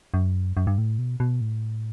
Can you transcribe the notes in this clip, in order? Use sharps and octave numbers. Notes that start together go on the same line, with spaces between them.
F#2
F#2
G2
A2
B2
B2
A2